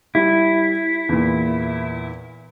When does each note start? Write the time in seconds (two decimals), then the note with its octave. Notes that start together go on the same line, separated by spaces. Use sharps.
0.15 G3 E4
1.09 E2 A#2